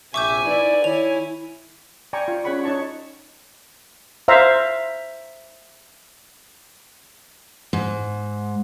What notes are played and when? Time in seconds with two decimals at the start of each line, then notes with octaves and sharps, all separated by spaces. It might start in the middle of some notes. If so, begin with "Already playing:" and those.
0.14 A#1 C3 E5 G#5 C#6 D6 G6
0.45 D#4 E4 B4 D5
0.84 D#3 E4 C#5 G#5 F7
2.13 D5 G5 G#5 A#5 B5 C#6
2.28 F4
2.44 C#4 G#4 C#5 F#5 B5 C#6
2.64 D#4 C#5 A5 C#6
4.28 C5 E5 F5 A#5
7.73 G#2